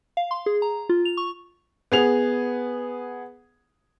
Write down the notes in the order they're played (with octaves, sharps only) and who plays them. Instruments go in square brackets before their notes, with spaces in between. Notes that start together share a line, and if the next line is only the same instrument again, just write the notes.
[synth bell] F5
C6
G#4
A#5
F4
F7
C#6
[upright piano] B3 G#4 F7